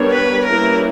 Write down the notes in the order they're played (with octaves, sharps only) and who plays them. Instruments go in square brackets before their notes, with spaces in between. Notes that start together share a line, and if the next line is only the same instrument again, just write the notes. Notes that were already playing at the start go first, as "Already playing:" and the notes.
Already playing: [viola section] G3 B3 D4 A#4 C#5
[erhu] B4
[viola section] G3 A#3 C#4 E4 B4 [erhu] A#4